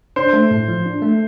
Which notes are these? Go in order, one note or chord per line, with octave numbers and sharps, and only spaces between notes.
D4 C5
A3
A2
F3
D4
A3